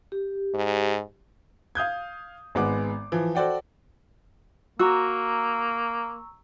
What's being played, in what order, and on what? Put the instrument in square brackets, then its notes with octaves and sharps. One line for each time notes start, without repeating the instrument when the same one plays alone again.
[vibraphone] G4
[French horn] G#2
[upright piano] F5 D#6 G6 G#6
G#1 G#3 B3 F#5 D6
E3 F3
F#4 A4 C5 D5 F#5 G5
[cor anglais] A#3 [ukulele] F#4 [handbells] A#5 C#6 E6